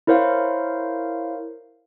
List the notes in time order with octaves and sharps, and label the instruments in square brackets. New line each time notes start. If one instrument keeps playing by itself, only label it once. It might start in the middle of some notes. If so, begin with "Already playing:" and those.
[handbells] E4 A#4 C5 C#5 F5